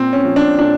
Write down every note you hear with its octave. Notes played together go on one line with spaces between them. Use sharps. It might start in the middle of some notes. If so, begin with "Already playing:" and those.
Already playing: A#2 C4
C#4
F3
D4
A#2 D4